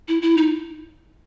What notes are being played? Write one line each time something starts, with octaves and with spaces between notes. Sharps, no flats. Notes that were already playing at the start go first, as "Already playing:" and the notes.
E4
E4
D#4